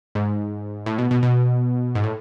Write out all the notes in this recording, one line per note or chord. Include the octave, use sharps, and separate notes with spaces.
G#2
A2
B2
B2
B2
G#2
A2